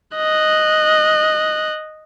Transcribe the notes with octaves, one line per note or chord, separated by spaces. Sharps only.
D#5 F#6